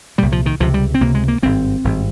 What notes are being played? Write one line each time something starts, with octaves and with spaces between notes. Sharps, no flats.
C2 A#2 G3
F3
D#3
C#2 C3 F3
G3
C4
C#2 C3 A#3
G#3
A#3
G#1 G2 C4
G#1 G2